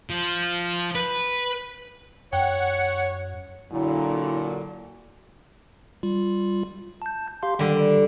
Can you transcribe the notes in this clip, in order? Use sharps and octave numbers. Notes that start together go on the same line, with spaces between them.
F3
B4
F#2 C#5 F#5 G5
A#2 D3 F#3 E4
G3 F4
A5 G6
G4 F5 C6
D3 D#3 G3